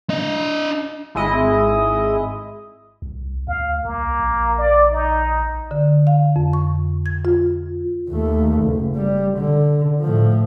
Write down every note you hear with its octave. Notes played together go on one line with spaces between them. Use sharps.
D4 D#5
G#1 G#3 E4 D#5
C2
D2 F5
C2 A#3
A#1
D5
D#4
D3
F5
F2
C#6
G#6
F4
D#2 A3
F#1
G3
D3
A2 F3